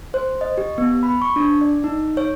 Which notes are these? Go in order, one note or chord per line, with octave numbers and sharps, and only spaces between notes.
C5
D#5
G4
B3
B5
C#6
D4
D5
D#4
C#5